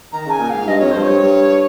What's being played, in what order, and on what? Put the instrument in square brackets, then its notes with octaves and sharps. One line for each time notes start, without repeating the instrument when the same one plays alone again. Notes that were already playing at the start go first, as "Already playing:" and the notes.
[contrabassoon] D#3 [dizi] A#5
[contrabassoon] C#3 [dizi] G#5
[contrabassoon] A#2
[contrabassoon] G#2 [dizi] F5
[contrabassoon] G2 [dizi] D#5
[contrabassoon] F2 [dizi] C#5
[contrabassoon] G2 [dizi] C5
[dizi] C#5
[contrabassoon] G2
G2